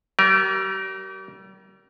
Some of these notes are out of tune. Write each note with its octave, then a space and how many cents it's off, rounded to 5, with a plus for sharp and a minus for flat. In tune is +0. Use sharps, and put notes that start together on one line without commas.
G3 -40 A#4 +15